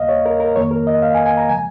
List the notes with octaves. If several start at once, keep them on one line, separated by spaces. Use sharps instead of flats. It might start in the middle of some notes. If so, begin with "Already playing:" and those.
Already playing: D#2 C#3 A#3 D#5 F5
C#5
A#4
A#4
F2 D#3 A#3 C#5
A#4
D#5
F5
G#5
G#5
A#5
C#3 F3 G#3 G#5